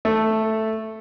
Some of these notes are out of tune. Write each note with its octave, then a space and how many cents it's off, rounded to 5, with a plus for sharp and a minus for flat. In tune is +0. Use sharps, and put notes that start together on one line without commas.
A3 +0